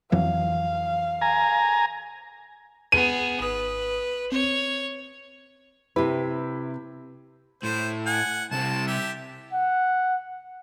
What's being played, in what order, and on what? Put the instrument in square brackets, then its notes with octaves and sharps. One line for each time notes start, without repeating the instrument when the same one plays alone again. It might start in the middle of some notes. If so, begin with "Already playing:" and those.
[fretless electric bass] F2 E3 F#3 [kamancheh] F5
[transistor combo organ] G#5 A#5
[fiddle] B3 G#4 [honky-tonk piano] D#7
[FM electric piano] G#1 D#6 [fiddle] B4
[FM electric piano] C4 [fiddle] C#5
[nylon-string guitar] C3 B4 [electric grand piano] E4 G4
[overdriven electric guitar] A2 [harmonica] C5
[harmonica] F#5 G#5
[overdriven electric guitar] C2 C3 [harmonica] A5
[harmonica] G4 E5
[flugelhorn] F#5